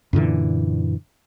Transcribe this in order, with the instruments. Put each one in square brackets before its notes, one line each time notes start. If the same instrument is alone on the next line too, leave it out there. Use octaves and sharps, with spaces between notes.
[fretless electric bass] F#2 A#2 D3 E3